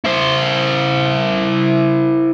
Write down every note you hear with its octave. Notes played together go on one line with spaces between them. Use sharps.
E4 C5